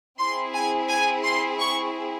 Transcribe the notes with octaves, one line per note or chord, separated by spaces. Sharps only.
C4 E4 G#4 C6
G#5
G#5
C6
C#6